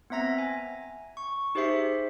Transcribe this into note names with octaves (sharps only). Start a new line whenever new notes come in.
B3 C4 E5 A#5 A#6
G#5
C#6
D#4 G4 G#4 C5 E5 C7